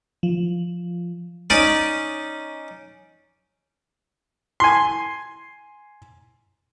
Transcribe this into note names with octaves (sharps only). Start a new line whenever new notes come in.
F3
C#4 D#4 D5
G#5 C6